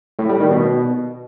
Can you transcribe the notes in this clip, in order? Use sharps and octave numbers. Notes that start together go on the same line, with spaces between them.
A2
G3
D#3
B2